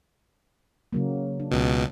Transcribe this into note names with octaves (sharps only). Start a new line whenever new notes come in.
C#3 F#3 A#3
D4
C#2 B2